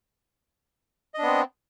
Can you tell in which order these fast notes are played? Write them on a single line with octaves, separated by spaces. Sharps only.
D#5 D4 B3 C4